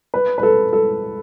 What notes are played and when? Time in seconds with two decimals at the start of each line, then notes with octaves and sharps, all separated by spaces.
0.14 B4
0.38 B4
0.43 A4
0.73 A4